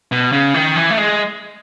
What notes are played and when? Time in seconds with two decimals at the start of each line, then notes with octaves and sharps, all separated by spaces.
0.12 B2
0.32 C#3
0.54 D#3
0.76 E3
0.90 A3
0.98 G#3